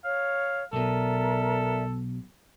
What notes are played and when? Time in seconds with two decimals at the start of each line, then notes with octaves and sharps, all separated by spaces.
0.04 C#5 F5
0.73 B1 B2 A4 A#4 D5 E5